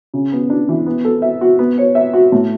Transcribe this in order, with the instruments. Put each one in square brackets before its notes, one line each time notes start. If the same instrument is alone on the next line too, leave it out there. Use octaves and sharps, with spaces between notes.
[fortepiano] C#3
B3
D4
E3
B3
A4
E5
F#4
B3
C#5
E5
F#4
A2